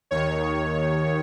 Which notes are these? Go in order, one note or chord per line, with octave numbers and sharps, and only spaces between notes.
D#2 D#3 C#5